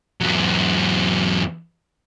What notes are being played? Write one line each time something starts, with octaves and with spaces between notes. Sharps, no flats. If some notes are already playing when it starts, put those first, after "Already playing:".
E2 F#3